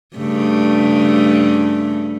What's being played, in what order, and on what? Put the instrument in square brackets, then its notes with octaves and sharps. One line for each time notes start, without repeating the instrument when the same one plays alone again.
[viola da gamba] G2 C#3 A3